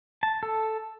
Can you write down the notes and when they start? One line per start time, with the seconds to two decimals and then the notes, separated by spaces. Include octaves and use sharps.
0.23 A5
0.43 A4